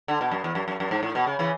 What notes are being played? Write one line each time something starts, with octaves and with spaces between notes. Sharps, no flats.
D3
B2
F#2
E2
F#2
F#2
F#2
G#2
A2
B2
C#3
C#3 E3